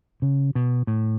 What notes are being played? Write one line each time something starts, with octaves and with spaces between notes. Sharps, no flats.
C#3
B2
A2